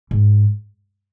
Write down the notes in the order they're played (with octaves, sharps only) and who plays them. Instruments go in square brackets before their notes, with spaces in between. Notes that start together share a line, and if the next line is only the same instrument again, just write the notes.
[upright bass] G#2